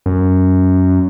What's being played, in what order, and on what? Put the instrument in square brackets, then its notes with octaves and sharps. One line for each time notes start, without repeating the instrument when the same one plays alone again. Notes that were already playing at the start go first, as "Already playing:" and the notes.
[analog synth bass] F#2